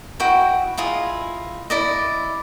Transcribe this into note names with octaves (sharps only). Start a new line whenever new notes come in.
E4 F#4 D#5 G5
E4 F4 G#4 D#5
E4 D5 D#5